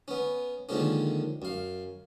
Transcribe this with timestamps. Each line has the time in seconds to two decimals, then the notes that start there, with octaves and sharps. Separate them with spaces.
0.08 B3 C#4
0.69 D3 D#3 F3 G#3 A#3 C#4
1.42 F#2 F5